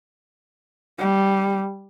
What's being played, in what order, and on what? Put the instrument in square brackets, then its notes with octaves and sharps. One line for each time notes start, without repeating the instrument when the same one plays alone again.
[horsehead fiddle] G3